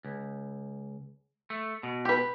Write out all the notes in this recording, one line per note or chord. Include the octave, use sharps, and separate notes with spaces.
C#2
A3
B2
G4 B4